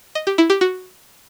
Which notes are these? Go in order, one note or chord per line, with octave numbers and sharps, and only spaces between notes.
D#5
G4
E4
G4
F#4